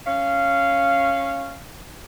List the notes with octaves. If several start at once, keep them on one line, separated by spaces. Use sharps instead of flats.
C#4 F5